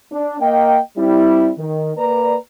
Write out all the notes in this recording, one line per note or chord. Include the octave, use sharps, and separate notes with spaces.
D4
A#3 D#5 G5
G3 C4 E4
D#3
A#3 B4 D5 A#5